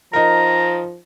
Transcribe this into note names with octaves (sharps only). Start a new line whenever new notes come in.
F3 D#4 A#4 A#5